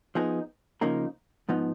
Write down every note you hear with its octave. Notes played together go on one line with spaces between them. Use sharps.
F3 B3 D#4 G#4
C#3 F3 A#3 D#4 A#4
G#2 F3 B3 D#4